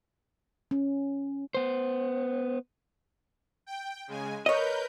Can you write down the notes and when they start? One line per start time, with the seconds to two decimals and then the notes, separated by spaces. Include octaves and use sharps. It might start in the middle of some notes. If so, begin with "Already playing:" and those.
0.71 C#4
1.54 B3 C5
3.66 G5
4.07 C#3 G#3 G#5
4.46 A#4 B4 C#5 D#5 G6